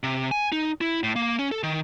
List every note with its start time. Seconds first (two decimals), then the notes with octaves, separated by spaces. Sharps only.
0.03 C3
0.31 G#5
0.52 D#4
0.81 E4
1.03 A2
1.16 A#3
1.39 C#4
1.51 A4
1.63 D#3